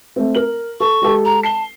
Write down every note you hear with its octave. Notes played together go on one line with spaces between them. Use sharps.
A3 C4
A#4 F#7
A4 C#6
G#3 G4 A4
A#5
A5 C7 G7